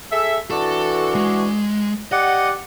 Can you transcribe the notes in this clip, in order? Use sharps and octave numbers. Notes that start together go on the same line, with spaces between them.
G#4 A4 E5
E3 D4 F#4 A4
G#3
G4 D5 D#5 F#5